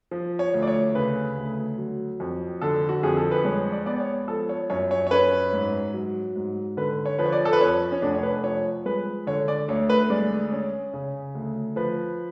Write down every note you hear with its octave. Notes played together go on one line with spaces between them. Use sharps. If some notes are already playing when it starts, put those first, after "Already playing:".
F3
C#5
D2
D5
C#5
C#3 B4
D2
F#3
F2
D3 A4
F#4
F2 G#4
A4
B4
G#3 C#5
D5
B3 D5
C#5
F3 A4
C#5
F#2 C#5
C#5
C#5
C#4 B4
G#2
F#3
G#2
D3 B4
C#5
F3 B4
C#5
D5
A4
B4
F2 C#5
C#4
F1 D4
C#5
B4
F3 C#5
G#3 B4
D3 C#5
D5
D2 C#5
B4
G#3 D5
C#4
C#3
D2
F3 B4